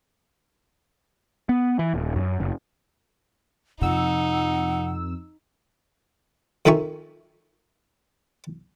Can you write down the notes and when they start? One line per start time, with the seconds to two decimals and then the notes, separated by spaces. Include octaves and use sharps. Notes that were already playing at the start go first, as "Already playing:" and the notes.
1.49 B3
1.79 E3
1.94 D#1
2.16 F#2
2.40 F#1
3.82 F2 C3 D#4 F#5 E6
6.65 F2 D#3 D#4 E5 G#5 C#6